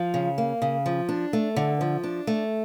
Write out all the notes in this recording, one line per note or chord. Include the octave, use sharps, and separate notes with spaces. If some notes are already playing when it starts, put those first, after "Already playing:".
Already playing: F3
C#3
A#3
C#3
F3
D4
A3
D3
F3
D4
A3